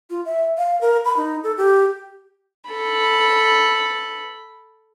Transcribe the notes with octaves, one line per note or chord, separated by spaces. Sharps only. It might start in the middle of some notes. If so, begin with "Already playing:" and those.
F4
E5
F5
A#4
B5
D#4
A4
G4
A4 B5